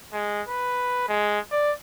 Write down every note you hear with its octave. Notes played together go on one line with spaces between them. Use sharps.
G#3
B4
G#3
D5